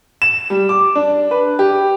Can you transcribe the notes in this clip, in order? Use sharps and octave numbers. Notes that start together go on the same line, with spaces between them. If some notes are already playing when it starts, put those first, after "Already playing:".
E7
G3
D6
D4
B4
G4